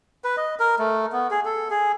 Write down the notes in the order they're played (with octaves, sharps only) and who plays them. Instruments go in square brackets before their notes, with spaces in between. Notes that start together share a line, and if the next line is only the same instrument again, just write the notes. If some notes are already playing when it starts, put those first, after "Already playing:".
[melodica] B4
D#5
A#4
A3
B3
G#4
A4
G#4